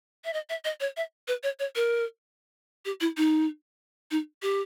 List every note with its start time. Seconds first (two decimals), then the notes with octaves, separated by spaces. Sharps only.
0.25 E5
0.33 D#5
0.50 E5
0.65 D#5
0.80 C#5
0.97 E5
1.28 B4
1.43 C#5
1.59 C#5
1.76 A#4
2.85 G4
3.01 E4
3.17 D#4
4.11 D#4
4.42 G4